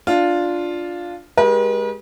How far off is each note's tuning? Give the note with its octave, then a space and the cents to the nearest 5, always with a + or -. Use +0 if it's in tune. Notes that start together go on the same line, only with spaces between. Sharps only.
D4 +0 F4 +0
G#3 +0 G4 +0 B4 -45